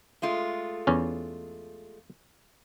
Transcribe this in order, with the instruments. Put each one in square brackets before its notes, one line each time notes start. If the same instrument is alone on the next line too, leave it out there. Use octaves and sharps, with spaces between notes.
[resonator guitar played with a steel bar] G#3 A3 F4
[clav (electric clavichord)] E2 C#4